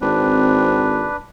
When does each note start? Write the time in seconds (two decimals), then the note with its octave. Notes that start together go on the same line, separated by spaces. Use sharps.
0.01 G#1 C4 D4 B4